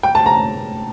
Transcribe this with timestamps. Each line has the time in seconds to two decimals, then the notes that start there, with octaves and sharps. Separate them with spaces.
0.03 G5
0.15 A5
0.26 A#5